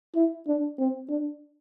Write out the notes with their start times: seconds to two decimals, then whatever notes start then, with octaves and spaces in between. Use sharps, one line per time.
0.15 E4
0.47 D4
0.78 C4
1.09 D4